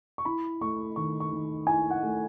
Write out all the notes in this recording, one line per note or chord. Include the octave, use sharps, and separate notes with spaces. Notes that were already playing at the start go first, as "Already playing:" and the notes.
C#6
E4 B5
A3 C#6
D#3 C#6
C#6
D#3
E4 G#5
F#5
A3